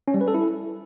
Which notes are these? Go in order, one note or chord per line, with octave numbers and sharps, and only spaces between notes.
C#4
G3
B4
A4
E4